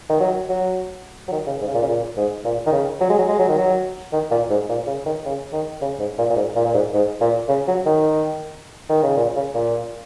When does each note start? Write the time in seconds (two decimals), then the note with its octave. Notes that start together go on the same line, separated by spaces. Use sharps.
0.09 D#3
0.20 F#3
0.49 F#3
1.28 F#3
1.32 D#3
1.47 C#3
1.61 G#2
1.67 C#3
1.75 A#2
1.83 C#3
1.88 A#2
2.17 G#2
2.44 A#2
2.66 D#3
2.72 C#3
3.01 F#3
3.10 G#3
3.18 F#3
3.29 G#3
3.39 F#3
3.49 D#3
3.58 F#3
4.13 D#3
4.31 A#2
4.50 G#2
4.69 A#2
4.87 C#3
5.06 D#3
5.25 C#3
5.52 D#3
5.81 C#3
5.99 G#2
6.18 A#2
6.30 A#2
6.36 G#2
6.56 A#2
6.66 A#2
6.74 G#2
6.94 G#2
7.21 A#2
7.49 C#3
7.68 F#3
7.86 D#3
8.89 D#3
9.03 C#3
9.17 A#2
9.36 C#3
9.54 A#2